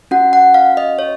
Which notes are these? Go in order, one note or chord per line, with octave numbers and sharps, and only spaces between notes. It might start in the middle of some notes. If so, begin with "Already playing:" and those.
C#4 F#4 F#5
F#5
F5
D#5
C#5